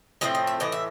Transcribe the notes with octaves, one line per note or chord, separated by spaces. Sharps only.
A2 F3 A3 C4 D#5
D#5
E5
A2 E3 D#5
E5